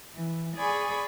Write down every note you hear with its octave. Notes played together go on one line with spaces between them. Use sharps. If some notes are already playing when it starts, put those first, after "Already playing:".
E3
G#4 D5 G#5 B5 C#6